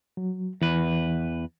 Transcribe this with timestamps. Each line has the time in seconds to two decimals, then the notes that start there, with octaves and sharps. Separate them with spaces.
0.17 F#3
0.62 E2 E3 B4